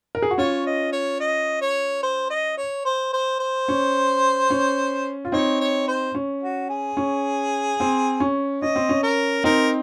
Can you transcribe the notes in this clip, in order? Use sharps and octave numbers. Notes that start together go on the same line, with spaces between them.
A#4
G#4
F#4
C#4 F4 C#5
D#5
C#5
D#5
C#5
C5
D#5
C#5
C5
C5
C5
C#4
C#4
F4
C4 D#4 C#5
C#5
C5
C#4
F#4
G#4
C#4
C4
C#4
C#4 D#5
C4
C#4
A#4
C4 D#4 A#4